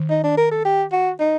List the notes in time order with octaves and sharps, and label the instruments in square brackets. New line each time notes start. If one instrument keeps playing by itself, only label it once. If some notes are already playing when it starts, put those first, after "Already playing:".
Already playing: [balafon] D#3
[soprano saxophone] D#4
D4
A#4
A4
G4
F#4
D#4